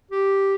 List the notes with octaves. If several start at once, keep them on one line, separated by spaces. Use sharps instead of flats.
G4